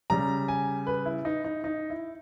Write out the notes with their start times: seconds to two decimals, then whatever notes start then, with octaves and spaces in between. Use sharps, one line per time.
0.10 C#3 G3 A#5
0.48 G#5
0.87 B4
1.05 E4
1.25 D#4
1.44 D#4
1.64 D#4
1.90 E4